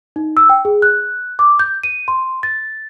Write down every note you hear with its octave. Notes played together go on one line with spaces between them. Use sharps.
D#4
E6
G5
G#4
F#6
D6
G6
D#7
C6
A6